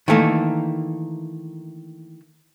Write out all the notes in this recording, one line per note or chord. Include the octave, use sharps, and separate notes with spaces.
D#3 E3 A3 A#3